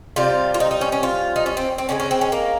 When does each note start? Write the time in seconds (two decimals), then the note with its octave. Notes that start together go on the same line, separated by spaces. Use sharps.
0.16 C3 G3 F4
0.54 F4
0.60 D#4
0.71 D#4
0.81 C#4
0.92 C#4
1.03 F4
1.36 D#4
1.46 C#4
1.57 C4
1.78 C4
1.89 C#3 F3 G#3 C#4
2.00 C#4
2.11 C4
2.21 C#4
2.32 A#3